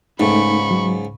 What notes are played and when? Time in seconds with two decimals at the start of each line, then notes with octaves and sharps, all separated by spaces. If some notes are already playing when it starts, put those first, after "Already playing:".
0.20 C#2 G#2 A3 D#4 B5 C#6
0.71 F#3